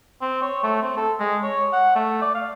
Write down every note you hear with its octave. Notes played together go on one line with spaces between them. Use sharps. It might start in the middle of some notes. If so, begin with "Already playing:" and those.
C4
C#5
A3
C4
A4
G#3
C#5
F#5
A3
D5
F5